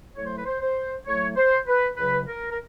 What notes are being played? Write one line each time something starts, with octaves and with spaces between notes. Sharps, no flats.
A2 F#3 A3 C#5
C5
B4
C5
C5
A2 F#3 A3 C#5
C5
B4
C#2 C#3 F#3 B4
A#4
A#4